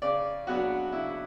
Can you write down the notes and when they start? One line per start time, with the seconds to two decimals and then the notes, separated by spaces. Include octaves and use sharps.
0.02 C#3 D5
0.47 F#3 B3 D4 F#4
0.92 C#3 E4